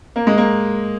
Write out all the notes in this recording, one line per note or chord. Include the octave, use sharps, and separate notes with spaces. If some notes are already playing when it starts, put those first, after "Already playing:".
A#3
G#3
A#3